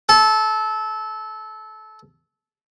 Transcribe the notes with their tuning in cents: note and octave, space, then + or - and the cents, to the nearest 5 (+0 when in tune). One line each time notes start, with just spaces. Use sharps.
A4 -20